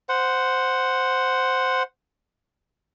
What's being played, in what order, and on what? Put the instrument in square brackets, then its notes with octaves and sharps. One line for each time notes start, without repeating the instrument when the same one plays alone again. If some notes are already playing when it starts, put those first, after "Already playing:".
[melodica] C5 F#5